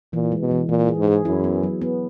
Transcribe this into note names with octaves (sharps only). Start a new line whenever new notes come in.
A#2 E3
G#3
B2
E3
A#2 E3
G#4
G#2
G#4
F#2 E4
B3
F#3
B3